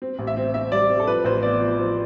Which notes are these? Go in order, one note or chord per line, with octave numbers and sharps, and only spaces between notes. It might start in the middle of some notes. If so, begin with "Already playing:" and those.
C4
A1
E5
C4
C4 E5
G3 D5
C4
A4
F3 B4
A1 C5
B3 D5
F3
F3